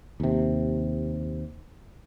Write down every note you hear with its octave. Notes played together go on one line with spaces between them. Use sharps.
D#2 C3